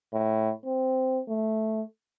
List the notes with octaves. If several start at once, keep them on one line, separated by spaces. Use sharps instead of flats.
A2
C4
A3